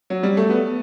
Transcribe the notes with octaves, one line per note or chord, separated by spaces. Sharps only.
F#3
G3
A3
B3